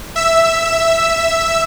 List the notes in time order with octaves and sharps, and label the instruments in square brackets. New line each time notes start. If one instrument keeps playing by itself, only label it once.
[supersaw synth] E5 E6